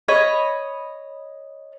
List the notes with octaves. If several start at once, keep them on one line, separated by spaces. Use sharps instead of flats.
C#5 D#5 B5